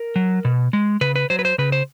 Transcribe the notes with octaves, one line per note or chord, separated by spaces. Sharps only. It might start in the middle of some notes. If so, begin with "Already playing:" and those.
Already playing: A#4
F#3
B2
G#3
C#3 B4
B4
F#3 C5
B4
C5
C#3 B4
C5